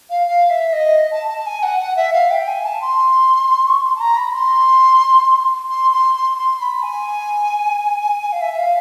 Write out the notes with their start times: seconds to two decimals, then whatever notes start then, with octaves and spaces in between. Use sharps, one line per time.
0.10 F5
0.27 F5
0.50 E5
0.73 D#5
1.12 A5
1.29 A5
1.46 G#5
1.63 F#5
1.80 F#5
1.96 E5
2.13 F5
2.31 G5
2.47 G#5
2.65 A5
2.82 C6
3.66 C#6
3.83 C6
3.96 A5
4.00 A#5
4.17 B5
4.34 C6
5.70 C6
5.92 C6
6.15 C6
6.38 C6
6.60 B5
6.82 G#5
8.32 F5
8.41 E5
8.58 F5